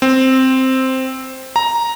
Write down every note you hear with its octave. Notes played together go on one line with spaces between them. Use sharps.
C4
A#5